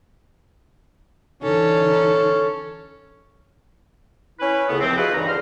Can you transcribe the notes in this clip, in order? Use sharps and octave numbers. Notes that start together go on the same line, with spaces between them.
D3 E3 C#4 D#4 A4
C#4 E4 B4
C#2 A2 C#3 B3
D#2 E3 F3 C4
D#4 F4 F#4 G#4 B4
C#2 G2 E3 D#4 A#5
C#2 D3 C5 C6 F6